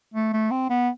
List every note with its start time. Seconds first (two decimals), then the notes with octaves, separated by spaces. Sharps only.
0.14 A3
0.33 A3
0.51 C4
0.70 B3